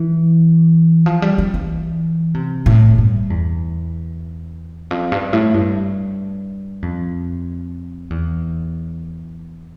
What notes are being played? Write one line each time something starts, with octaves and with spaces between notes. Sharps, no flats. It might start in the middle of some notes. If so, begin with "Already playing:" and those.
Already playing: E3
F3
G3
F3
E3
C3
A2
G2
E2
F2
G2
A2
G2
F2
E2